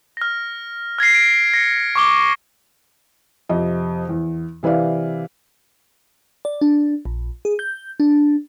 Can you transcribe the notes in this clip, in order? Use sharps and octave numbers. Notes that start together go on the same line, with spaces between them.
F6 A#6
F6 G#6 A#6 C7
D7
A#6 C#7
C#6 D6 G7
F2 C3 D#5
E2
C3 E3 B4 D5 F5
D5
D4
A#1
G#4
G6
D4